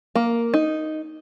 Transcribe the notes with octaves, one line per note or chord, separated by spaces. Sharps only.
A#3
D#4